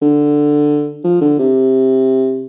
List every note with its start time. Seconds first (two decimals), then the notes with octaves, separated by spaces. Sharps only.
0.02 D3
1.04 F3
1.21 D3
1.39 C3